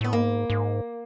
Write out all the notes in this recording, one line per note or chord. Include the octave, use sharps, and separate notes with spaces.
A2 B3
G#2 A#3
G#2